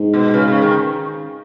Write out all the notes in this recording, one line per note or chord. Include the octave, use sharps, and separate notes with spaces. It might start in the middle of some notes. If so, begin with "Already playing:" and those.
Already playing: G#2
B2
C#3
C#3
D#3